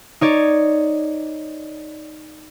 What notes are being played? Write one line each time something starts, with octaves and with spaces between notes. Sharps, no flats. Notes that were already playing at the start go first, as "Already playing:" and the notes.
D#4 C#5 D5